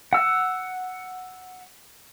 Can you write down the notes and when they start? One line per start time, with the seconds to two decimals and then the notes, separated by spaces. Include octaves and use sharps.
0.13 F#5 E6